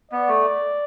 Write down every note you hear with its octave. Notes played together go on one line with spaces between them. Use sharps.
B3 D5
A3